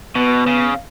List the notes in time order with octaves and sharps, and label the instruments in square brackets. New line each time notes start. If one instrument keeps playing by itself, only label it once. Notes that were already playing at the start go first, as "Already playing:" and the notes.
[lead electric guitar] B2 [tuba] B3
[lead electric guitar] C#3